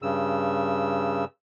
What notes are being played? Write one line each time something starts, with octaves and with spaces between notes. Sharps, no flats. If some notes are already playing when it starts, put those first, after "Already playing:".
G2 C#3 E6